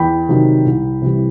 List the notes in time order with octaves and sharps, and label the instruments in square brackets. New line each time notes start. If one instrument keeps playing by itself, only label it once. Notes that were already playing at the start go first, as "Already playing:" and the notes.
Already playing: [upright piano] E2 G5 B5
C3 D#3 F#3
C2
C3 E3 G3